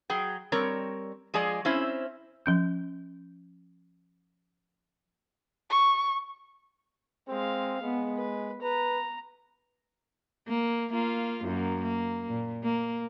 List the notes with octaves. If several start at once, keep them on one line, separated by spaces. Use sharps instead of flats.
F#3 G#4 G5
G3 C4 A#4 C#5
F3 G#3 G#4 D5 D#5
C4 C#4 E4 C5
F3 C#4 G6
C#6
G#3 C4 F5
G#3 B3
B4
B4 A#5
A#3
A#3 F4
F#2 A#3
A#3
A#2
A#3